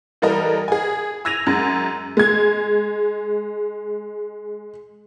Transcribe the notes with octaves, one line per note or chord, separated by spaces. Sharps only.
E3 G3 A4 A#4 D#5
G#4 G#5
E6 G#6 A#6 D#7 F7
F#2 G#3
G#3 G#6